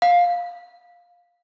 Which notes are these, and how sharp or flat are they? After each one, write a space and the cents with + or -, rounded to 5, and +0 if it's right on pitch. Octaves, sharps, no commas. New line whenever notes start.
F5 +10